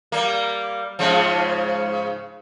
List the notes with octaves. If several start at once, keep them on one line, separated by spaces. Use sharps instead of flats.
G3 A#3
G#2 C#3 F3